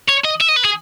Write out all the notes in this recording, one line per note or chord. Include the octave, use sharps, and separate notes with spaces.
C#5
D#5
E5
D#5
B4
G#4